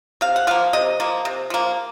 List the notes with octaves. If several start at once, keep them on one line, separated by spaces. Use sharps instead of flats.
C3 F5
F#5
F3 A#3 F5
C3 D#5
F3 A#3
C3
F3 A#3